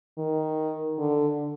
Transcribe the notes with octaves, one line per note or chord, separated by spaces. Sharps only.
D#3
D3